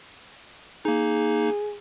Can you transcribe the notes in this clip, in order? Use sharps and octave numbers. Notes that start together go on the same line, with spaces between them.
A#3 D#4 G#4